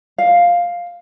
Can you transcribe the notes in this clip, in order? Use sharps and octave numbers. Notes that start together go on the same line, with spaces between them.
F5